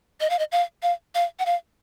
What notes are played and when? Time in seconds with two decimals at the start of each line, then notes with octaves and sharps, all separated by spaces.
0.20 D#5
0.30 F5
0.39 D#5
0.52 F5
0.83 F5
1.15 F5
1.39 F#5
1.46 F5